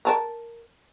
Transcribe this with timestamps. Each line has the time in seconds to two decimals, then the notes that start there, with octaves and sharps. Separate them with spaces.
0.05 A#4 A5 A#5